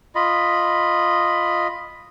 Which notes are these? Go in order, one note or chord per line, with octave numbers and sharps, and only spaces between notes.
F4 D#5 B5